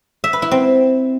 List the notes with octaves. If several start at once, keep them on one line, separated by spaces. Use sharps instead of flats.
E5
B4
E4
C4